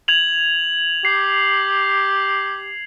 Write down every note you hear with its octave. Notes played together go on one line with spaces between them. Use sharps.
G#6 F7 F#7
G4 C7